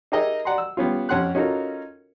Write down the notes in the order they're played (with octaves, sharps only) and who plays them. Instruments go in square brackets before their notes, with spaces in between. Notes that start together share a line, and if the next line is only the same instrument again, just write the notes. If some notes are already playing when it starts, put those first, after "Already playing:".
[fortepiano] D#4 G4 G#4 A#4 D#5 E5
D5 F#5 A#5 C6
E6
G3 B3 C#4 F4
F2 C#4 F#5 C6 F#6
C#4 D#4 F4 F#4 A4 A#4